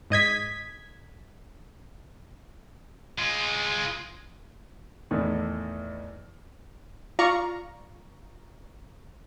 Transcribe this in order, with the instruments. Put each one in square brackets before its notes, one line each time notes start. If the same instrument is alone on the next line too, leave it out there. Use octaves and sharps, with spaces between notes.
[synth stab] G#2 D#5 G#6 B6
[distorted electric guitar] G#3 F4
[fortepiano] E2 A2 D#3
[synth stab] F4 D5 F5 A#5 C#6